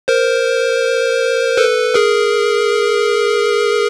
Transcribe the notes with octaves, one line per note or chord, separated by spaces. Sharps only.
A#4 C5
A4 B4
G#4 A#4